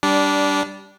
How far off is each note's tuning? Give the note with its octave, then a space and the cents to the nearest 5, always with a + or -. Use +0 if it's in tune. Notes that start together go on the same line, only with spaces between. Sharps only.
G3 -5 D4 -15